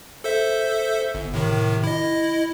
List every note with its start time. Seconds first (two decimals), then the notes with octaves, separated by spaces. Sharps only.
0.24 A4 C5 E5
1.15 G1
1.34 A2 C3 D#3
1.83 E4 D#5